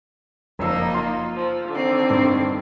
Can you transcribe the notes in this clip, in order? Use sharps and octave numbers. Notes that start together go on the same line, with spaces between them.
F#1 F3 A#3 D#4 E6
F4 C6
F3
D3 D#3 C4
G2